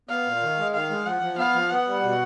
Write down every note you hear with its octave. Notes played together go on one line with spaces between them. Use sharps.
B3 F5
A#2
D#3
G#3
D#3 F5
G#3
F3 F#5
F3
B3 F5
F3
B3 F#5
G3
B2